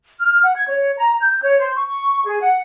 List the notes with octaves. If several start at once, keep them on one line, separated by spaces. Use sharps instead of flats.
F6
F#5
G#6
C#5
A#5
G6
C#5
C5
C#6
G#4
F#5